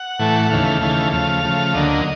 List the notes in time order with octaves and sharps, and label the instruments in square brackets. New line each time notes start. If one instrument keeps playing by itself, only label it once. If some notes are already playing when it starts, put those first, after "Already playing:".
Already playing: [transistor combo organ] F#5
A2 E3 A3
F#5
D#2 C#3 E3 A3 F5
D#2 C#3 E3 A3
C#3 F3 A3 F5
C#3 F3 A3
D2 D3 F#3 A#3 D#5